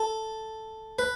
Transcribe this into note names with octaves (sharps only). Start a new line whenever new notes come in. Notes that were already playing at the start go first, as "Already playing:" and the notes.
Already playing: A4
B4